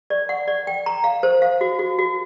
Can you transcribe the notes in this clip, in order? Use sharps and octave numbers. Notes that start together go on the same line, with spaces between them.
D5
F#5
D5
G5
A#5
F5
C5
F5
F#4
F#4
F#4